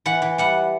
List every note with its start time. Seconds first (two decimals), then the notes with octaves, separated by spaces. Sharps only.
0.06 E3 F#5
0.22 E3
0.38 G3 F#5